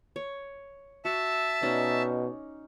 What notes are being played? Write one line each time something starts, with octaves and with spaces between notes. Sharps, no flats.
C#5
F#4 E5 A5
B2 C#4 D#4 D5